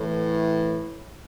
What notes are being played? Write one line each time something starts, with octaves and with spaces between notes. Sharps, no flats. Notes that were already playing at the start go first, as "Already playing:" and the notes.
Already playing: A2 E3